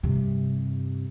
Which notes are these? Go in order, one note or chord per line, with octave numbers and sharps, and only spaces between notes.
G2 C3